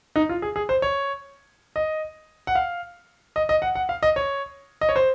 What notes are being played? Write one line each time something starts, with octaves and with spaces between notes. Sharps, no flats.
D#4
F4
G#4
G#4
C5
C#5
D#5
F#5
F5
D#5
D#5
F#5
F#5
F5
D#5
C#5
D#5
C#5
C5